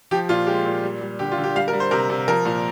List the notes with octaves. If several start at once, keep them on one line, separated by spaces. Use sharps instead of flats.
F3 G4
A#2 F4
G#3 G4
A#2
G3
G3
D3 G4
F4
D3
G4
G3 F5
A#4
G3
C5
C3 A#4
C3
F3 A#4
A#2